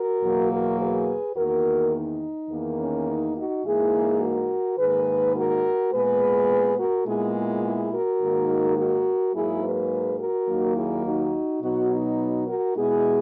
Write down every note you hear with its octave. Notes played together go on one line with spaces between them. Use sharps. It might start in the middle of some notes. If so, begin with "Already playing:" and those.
Already playing: F#4 A#4
E2 B2 F#3 A#3
F#4 A#4
G#4 B4
E2 D#3 A#3 F#4 A#4
D#4
E2 D#3 A#3
C#4
D#4
D#4 F#4
G#2 E3 A#3 E4 G#4
F#4 A#4
G#2 D#3 A#3 G#4 B4
F#4 A#4
A#2 G#3 B3 G#4 B4
F#4 A#4
A#2 G#3 B3 E4 G#4
E4 G#4
E4 G#4
F#4 A#4
G#2 D#3 A#3
F#4 A#4
G#2 F#3 A#3 E4 G#4
G#4 B4
F#4 A#4
D#2 D#3 F#3 A#3
E4 G#4
D#4 F#4
B2 F#3 B3 D#4 F#4
D#4
F#4 A#4
B2 G#3 B3 E4 G#4